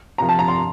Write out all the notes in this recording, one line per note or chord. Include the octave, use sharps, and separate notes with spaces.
C3 F3 A#5
A5
A#5
C6